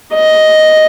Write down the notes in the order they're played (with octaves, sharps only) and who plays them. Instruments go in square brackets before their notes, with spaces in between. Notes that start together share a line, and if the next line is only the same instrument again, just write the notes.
[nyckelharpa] D#5